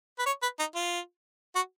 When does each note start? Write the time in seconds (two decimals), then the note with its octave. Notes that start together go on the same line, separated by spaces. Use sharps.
0.19 B4
0.26 C#5
0.42 B4
0.59 D#4
0.75 F4
1.55 F#4